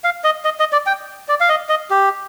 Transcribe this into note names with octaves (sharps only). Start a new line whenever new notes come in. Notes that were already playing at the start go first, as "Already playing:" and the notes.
F5
D#5
D#5
D#5
D5
G5
D5
F5
D#5
D#5
G4